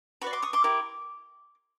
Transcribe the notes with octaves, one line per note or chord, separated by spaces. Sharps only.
F#4 B4 D5 B5 C#6
C6 D6
C#6 D#6
C6 D6
E4 G4 A#4